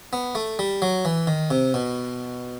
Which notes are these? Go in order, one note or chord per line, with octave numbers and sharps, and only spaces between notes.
B3
A3
G3
F#3
E3
D#3
C3
B2